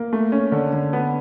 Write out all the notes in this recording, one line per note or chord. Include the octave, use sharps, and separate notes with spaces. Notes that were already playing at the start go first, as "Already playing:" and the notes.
Already playing: A#3
A3
C#4
D3
D3
B3